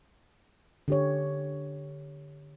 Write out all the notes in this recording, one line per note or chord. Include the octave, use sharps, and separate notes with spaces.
D3 G4 C#5